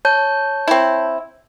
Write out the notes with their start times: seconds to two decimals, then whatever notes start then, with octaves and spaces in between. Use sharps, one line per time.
0.05 C#5 A5 G6
0.68 C4 E4